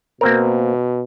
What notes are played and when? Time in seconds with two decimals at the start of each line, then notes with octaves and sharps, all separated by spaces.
0.21 B2 A#3 C4 A#4